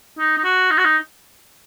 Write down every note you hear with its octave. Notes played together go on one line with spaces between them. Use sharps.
D#4
D#4
F#4
D#4
F#4
D#4